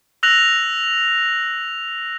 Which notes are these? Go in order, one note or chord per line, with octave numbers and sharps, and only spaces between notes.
E6 F#6 A#6 F7